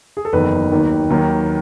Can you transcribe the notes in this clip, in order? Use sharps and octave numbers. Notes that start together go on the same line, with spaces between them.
G#4
A4
F#1 E2 D#3 F#3 B4
D#2 D#3 F#3
D#2 D#3 F#3